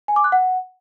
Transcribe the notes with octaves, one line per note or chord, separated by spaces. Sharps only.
G#5
D6
F#6
F#5